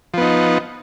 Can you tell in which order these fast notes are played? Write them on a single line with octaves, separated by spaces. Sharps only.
F3 B3 D#4